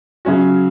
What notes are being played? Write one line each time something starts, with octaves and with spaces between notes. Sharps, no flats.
C#3 F#3 C#4 F#4